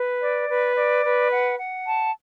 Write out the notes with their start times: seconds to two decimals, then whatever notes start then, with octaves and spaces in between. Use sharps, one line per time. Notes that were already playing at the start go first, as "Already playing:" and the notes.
Already playing: B4
0.21 D5
0.49 B4
0.76 D5
1.04 B4
1.31 F#5
1.59 F#5
1.86 A5